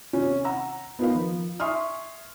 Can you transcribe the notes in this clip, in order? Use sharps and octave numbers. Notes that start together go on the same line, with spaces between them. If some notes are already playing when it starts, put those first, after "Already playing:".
C3 C#4
F#5 A#5 E6
B3 D#4 F4 A#4 B4 F5
F3
E5 G#5 C6 C#6 D#6 F6